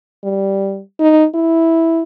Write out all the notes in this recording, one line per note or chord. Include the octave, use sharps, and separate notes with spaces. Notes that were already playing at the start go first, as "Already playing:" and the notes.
G3
D#4
E4